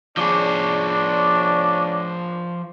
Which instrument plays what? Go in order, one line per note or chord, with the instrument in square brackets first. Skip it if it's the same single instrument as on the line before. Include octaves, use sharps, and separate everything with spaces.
[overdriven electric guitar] F3 G#4 [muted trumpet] D4 [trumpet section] C#5 D6